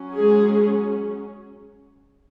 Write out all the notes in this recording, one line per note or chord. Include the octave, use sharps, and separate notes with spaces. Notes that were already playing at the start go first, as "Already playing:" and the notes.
Already playing: F#3 C#4
G#3 G#4